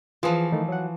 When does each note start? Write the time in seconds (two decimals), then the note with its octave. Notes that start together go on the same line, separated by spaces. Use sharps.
0.23 E3 F3 F4 G#4 B4
0.52 D#3 A3
0.68 F#3 F#5